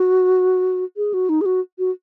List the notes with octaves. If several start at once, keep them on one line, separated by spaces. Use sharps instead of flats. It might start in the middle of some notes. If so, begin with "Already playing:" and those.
Already playing: F#4
G#4
F#4
D#4
G#4
F#4
F#4